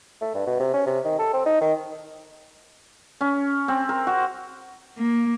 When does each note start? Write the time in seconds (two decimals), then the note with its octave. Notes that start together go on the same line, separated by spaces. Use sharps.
0.21 A3
0.34 G2
0.47 B2
0.60 C3
0.74 C#4
0.86 C3
1.05 D#3
1.19 A4
1.33 C4
1.46 D#4
1.61 D#3
3.21 C#4
3.68 C4
3.89 A#4
4.07 F#4
4.98 A#3